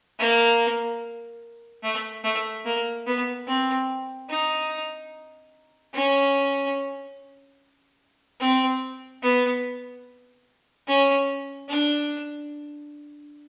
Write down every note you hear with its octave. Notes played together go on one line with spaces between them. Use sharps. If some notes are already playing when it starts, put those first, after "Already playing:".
A#3
A3
A3
A#3
B3
C4
D#4
C#4
C4
B3
C#4
D4